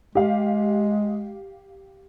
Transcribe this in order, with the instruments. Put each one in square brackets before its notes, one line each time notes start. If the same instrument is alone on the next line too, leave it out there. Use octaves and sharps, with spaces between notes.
[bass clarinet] G#3 [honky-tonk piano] G4 F5